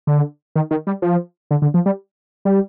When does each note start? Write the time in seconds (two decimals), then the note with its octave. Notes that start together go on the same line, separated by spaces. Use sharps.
0.07 D3
0.55 D#3
0.71 D#3
0.87 G3
1.02 F3
1.51 D3
1.62 D3
1.74 F3
1.86 G3
2.45 G3